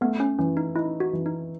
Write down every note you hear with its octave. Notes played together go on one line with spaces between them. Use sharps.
A3 B3
C#4
E3 C#4
D#4
D#4 E4
F#4
E3
D#4